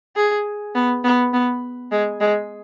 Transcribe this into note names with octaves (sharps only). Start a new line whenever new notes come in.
G#4
B3
B3
B3
G#3
G#3